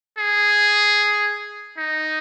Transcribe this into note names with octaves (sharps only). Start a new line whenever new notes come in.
G#4
D#4